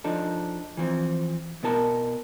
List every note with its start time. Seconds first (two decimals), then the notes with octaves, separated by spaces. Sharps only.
0.04 F3 D4 D#4 A4
0.77 E3 F3 C4
1.63 B2 B3 E4 A#4 A5